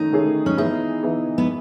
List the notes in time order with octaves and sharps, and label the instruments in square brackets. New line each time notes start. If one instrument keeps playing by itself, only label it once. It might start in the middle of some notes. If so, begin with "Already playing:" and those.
Already playing: [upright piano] D#3 A3 C#4 [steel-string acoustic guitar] D#4
[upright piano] D#3 A3 C#4 G#4
[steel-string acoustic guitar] C#4
[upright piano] E3 B3 E4 G#4 [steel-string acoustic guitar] D#4
[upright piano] E3 B3 E4 G#4
[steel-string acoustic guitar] B3